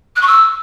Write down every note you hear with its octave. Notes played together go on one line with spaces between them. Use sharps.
F#6
C#6
E6